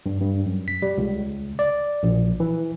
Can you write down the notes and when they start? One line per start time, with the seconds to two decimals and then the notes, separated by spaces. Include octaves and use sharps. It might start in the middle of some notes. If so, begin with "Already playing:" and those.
0.06 G2
0.22 G2
0.46 F#2
0.68 B6
0.82 G3
0.98 C#2
1.59 D5
2.03 A#1
2.40 E3